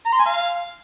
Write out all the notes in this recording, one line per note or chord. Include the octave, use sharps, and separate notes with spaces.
A#5
C6
G#5
F5